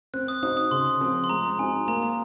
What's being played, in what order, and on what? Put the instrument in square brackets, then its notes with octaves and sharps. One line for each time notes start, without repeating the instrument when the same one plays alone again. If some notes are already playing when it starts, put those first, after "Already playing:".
[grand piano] C4 [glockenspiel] F#6
[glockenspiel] D#6
[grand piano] D#4 F#4 C5 [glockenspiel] D#6
[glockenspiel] D#6
[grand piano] C#3 [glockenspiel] C6
[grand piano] F3 C4
[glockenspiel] C6
[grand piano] G#3 [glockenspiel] A#5
[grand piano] C4 D#4 F#4 [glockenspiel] G#5
[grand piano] A#3 [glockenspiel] A#5